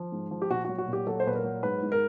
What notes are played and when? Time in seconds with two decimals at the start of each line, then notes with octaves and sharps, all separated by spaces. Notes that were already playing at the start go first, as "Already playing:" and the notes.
Already playing: F3
0.12 G#2
0.31 F3
0.42 G4
0.50 A#2 F#4
0.65 F#3 F#4
0.78 F#4
0.87 A#2
0.93 G4
1.07 F#3 A4
1.20 C5
1.26 A#2 B4
1.35 A#4
1.44 F#3
1.63 G#2 B4
1.82 G#2
1.92 A#4